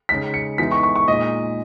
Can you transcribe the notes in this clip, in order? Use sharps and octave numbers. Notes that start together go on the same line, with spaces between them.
C#3 G#3 D#4 B6
C#7
E3 G#3 B3 D#4 B6
C#6
C#6
C#6
A#2 G#3 D#4 D#5